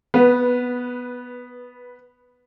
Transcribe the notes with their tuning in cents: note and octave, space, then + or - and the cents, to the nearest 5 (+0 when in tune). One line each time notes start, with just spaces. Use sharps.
B3 +0 B4 -15